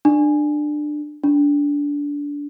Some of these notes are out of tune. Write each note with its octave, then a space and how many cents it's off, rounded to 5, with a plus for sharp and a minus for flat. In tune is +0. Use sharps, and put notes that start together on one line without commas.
D4 +20
D4 -20